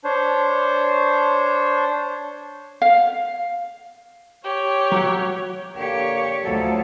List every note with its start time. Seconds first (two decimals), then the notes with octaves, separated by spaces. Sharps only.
0.04 D4 C5 C#5
2.82 F5
4.44 G4 C#5
4.92 F#3 F#5
5.76 D3 A#3 G4 C#5
6.43 D2 F3 F#3 A4